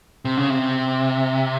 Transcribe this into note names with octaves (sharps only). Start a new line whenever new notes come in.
C3
C#3
C3